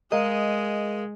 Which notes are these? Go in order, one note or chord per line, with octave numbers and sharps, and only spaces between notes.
G#3 G#4 A#4 D#5 F5